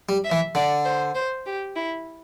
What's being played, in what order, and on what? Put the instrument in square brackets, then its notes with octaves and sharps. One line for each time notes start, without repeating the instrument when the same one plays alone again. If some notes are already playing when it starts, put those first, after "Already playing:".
[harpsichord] G3
[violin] E5
[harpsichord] E3
[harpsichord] D3 [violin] D5
[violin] C5
C5
G4
E4